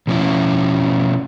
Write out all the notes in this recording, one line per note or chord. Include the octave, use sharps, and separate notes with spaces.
B2 F3 C#4 E4